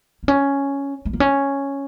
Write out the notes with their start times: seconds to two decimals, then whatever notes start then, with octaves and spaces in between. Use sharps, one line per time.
0.23 A#3
0.28 C#4
1.05 A3
1.13 A#3
1.20 C#4